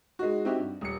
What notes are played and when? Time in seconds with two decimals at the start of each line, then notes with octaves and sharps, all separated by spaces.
0.19 G#3 D#4 F#4
0.45 C4 D#4 E4 F#4 G4
0.58 G2
0.81 D#1 C#7